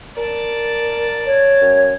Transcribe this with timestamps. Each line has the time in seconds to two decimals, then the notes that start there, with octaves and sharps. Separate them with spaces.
0.17 A#4 D5 A5
1.26 C#5
1.61 F#2